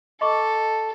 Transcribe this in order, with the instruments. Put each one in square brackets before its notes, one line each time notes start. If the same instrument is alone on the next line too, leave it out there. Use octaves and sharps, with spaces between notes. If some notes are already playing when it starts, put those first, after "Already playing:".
[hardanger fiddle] A4 [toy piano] D#5 C#6 D6